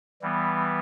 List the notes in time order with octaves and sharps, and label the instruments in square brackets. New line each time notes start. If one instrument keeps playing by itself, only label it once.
[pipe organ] E3 G3 B3